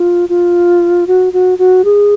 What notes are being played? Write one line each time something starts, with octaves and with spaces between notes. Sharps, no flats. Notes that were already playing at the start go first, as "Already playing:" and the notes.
Already playing: F4
F4
F#4
F#4
F#4
G#4